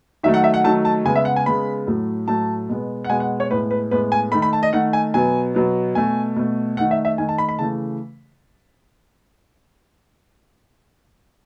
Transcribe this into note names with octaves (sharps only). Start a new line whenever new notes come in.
D#3 F#3 A3 E5
F#5
E5
F#5
D#3 F#3 A3 A5
A5
C#3 G#3 B3 G#5
E5
F#5
G#5
C#3 G#3 B3 B5
A2 F#3 A3
A2 F#3 A3 A5
B2 G#3 B3
F#5
B2 G#3 B3 G#5
F#5
C#5
A2 G#3 B3 B4
B4
A2 G#3 B3 B4
G#5
D#3 A3 B5
B5
A5
D#5
D#3 A3 F#5
G#5
B2 F#3 B3 G#5
B2 F#3 B3
B2 A3 G#5
B2 A3
D#3 A3 F#5
E5
E5
D#3 A3 G#5
A5
B5
B5
C#3 E3 A3 A5